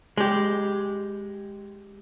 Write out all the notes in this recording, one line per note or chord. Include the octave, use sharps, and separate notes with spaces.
G#3 G4